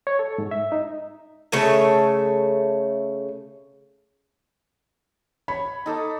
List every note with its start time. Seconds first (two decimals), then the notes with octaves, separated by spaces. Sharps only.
0.07 C#5
0.19 A4
0.38 G#2
0.51 E5
0.72 D#4
1.52 C#3 A3 C#5 E5
5.48 C#5 B5
5.86 D#4 A4 D6